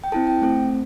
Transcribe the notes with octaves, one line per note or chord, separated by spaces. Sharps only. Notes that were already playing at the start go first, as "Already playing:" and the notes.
G5
C4 E4 A4 A5
G5
A3 C4 A4